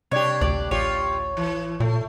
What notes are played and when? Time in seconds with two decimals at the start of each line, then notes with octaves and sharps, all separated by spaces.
0.12 G2 C3 D4 G4 C#5 D5 G#6
0.41 A1 D2 D5
0.71 A1 F4 G4 C#5
1.37 E3
1.80 A#2 A3